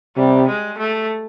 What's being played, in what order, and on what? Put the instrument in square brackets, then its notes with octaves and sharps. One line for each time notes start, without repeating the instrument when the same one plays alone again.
[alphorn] C3 [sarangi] G3
[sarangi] G#3
A3